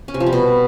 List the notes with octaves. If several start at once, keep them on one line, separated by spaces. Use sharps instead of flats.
C#4
C3
F3
G3
B2